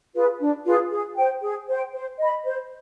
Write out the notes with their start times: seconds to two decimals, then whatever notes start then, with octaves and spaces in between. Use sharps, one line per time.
0.14 F4 G#4 B4
0.40 D4
0.65 F4 G#4 B4
0.91 G#4
1.17 C5 G5
1.42 G#4
1.68 C5 G5
1.94 C5
2.19 D#5 B5
2.44 C5